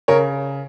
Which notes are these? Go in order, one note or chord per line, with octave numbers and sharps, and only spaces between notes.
C#3 A#4 C#5